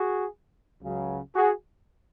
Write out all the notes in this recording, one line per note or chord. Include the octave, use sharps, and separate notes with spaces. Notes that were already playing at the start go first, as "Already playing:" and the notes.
Already playing: F#4 G#4
C#2 C#3 F#3
F#4 G#4